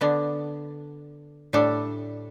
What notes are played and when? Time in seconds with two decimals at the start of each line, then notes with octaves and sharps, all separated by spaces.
0.01 D3 B3 D4
1.53 A2 G3 D4 A4